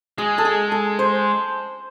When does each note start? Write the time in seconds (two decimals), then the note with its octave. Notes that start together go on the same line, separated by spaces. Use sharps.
0.18 G#3 G#4
0.38 A4
0.45 G#4
0.72 A4
0.99 C5